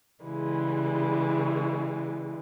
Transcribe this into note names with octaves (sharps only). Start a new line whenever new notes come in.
C#3 E3 G3 G#3